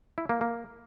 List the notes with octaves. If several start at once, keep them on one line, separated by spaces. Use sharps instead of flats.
E4
A#3
A#3